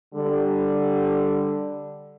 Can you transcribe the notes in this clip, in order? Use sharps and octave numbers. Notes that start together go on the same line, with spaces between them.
D3 G3